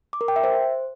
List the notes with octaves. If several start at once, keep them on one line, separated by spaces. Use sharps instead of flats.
D6
A#4
G5
E5
C5